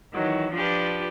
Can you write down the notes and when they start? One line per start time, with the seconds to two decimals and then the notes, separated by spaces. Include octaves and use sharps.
0.13 D#3 E3 F#3
0.53 F3 D4 F4 G4 B4